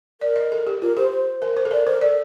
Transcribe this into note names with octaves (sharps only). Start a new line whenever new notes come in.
A#4 D5
D#5
A4
G4
F4 A#4
G4 C5
C5
A#4
C5
A4
A#4 D5
A#4 C5
A4 D5